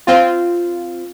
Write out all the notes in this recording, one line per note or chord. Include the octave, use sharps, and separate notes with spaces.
C4 F4